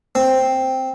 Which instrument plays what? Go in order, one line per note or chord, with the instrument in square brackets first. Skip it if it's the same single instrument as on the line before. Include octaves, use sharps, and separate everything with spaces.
[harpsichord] C4